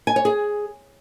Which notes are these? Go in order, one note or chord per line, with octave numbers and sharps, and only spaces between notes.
G#5
C#5
G#4